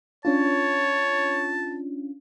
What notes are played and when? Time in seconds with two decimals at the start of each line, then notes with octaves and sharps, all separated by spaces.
0.25 C#4 D4 F4 C#5 A5